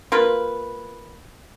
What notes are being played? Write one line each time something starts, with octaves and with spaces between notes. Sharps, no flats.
A#3 F4 B4